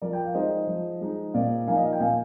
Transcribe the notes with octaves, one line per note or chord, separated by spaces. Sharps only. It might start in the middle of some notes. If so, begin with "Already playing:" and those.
F3 A#4 D5
G5
F5
G#3 D#4 C5 D#5
F3
G#3 D#4
A#2 D5 F5
F3 A#3 D#4 F5 G#5
D#5
F5
G5
A#2 F5 G#5